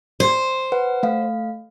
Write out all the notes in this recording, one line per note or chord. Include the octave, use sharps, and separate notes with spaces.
C5
B4 F#5
A3 F5